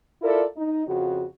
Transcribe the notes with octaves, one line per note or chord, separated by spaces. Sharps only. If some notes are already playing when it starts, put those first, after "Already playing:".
E4 F4 A4 A#4 D5
D#4
F2 C#3 F#4